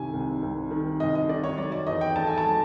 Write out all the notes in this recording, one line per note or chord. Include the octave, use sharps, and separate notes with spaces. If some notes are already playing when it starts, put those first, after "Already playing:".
Already playing: C2 C3 D#3 G#5
C2
C2
D#3
C2 D#5
D#5
D#3 D5
C#5
F#3 D5
D5
E2 D#5
G5
A3 A5
G#5
A5
F#3